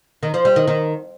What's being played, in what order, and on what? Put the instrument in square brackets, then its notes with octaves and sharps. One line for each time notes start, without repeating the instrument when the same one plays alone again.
[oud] D#3
F3
G3
D#3
D#3